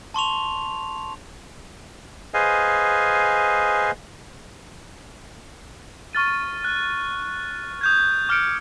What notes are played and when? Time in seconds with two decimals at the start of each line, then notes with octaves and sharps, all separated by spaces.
0.14 A5 C6 C#6 F7
2.34 G#4 B4 C5 D#5 F5 G#5
6.13 C#6 F6 A6 D#7
6.64 F#6
7.81 D#6 G6 G#6
8.29 D6 F6 G6 C#7 D7